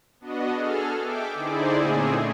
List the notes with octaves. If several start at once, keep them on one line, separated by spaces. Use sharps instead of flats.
B3 D4 F#4 D#5
G#4 A4 F6
E5 G5 D6
D3 D#4 E4 G#4 C5 D5
A#2 A3 C4 C#4 G#4